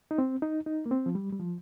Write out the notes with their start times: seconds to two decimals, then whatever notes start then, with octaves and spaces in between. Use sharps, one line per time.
0.11 D#4
0.18 C4
0.42 D#4
0.66 D#4
0.86 A#3
0.91 C4
1.06 F3
1.15 G3
1.33 G3
1.40 F3